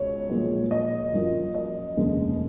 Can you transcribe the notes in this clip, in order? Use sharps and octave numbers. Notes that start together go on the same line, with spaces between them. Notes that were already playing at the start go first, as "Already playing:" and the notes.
Already playing: C#2 B2 C#5
B1 A#2 F3 G#3 B3
D#5
F#2 F3 A#3
D#5
F1 D#2 C#3 G#3 B3